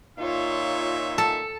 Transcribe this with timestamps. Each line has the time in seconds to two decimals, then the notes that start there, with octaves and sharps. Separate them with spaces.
0.18 A#2 D#4 F4 C#5 E5
1.18 A4